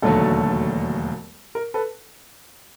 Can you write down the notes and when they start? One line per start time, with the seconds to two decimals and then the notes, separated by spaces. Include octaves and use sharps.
0.02 E1 D#2 D3 F#3 A3 A4
1.55 A#4
1.74 A4 B4